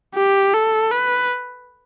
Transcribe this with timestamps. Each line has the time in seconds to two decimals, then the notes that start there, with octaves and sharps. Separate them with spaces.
0.15 G4
0.53 A4
0.91 B4